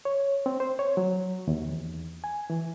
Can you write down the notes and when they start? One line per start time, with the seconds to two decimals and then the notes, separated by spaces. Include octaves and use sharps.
0.05 C#5
0.46 C4
0.60 C5
0.79 C#5
0.97 F#3
1.48 D#2
1.69 E2
2.24 G#5
2.50 E3